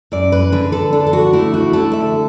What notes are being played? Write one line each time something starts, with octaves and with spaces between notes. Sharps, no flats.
F#2 D5
B4
D3 B4
A4
D4 A4
A4
F#4
A3 E4
F#4
D3 A4
E5